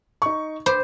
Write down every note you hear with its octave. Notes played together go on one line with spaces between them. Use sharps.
D#4 C#6
C5 B5 D6